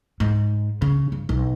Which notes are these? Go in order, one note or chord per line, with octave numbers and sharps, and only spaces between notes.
G#2
C#3
G2
B1